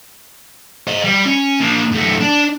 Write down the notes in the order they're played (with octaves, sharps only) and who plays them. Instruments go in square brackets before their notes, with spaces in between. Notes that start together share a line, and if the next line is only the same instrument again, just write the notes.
[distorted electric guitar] C5 D#5
G3
C#4
A#3 D4
F#2 A3
D4